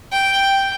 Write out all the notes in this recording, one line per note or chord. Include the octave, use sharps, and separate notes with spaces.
G5